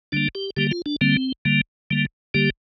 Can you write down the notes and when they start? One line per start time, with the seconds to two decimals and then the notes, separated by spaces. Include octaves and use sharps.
0.12 D3 G3 A#3 D4
0.35 G4
0.57 D3 G3 A#3 G4
0.71 F4
0.86 D4
1.01 D3 G3 A#3 C4
1.45 D3 G3 A#3
1.91 D3 G3 A#3
2.34 D3 G3 A#3 G4